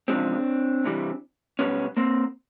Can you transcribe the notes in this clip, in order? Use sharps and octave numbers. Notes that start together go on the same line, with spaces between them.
E2 C#3 F3 G#3 C4 D4
C2 C3 E3 G3
B1 B2 G3 B3 C#4
A#3 C4